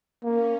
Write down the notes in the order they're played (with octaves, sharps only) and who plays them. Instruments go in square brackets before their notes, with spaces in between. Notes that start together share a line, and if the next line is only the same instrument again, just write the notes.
[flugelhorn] A#3 [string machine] C#4